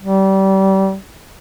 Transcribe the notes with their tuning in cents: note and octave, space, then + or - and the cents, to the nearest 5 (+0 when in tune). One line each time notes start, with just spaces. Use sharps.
G3 -25